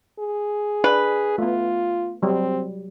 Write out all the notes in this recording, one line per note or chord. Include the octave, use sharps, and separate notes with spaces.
G#4
D4 B4
A3 B3 F4
F#3 G3 C4